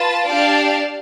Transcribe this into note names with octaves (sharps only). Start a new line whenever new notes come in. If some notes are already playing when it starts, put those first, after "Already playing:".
Already playing: F4 B4 A5
D4 G4 D5 F5 A5